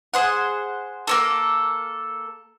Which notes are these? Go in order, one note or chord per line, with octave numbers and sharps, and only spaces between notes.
G#4 C5 F#5
A#3 C#4 A4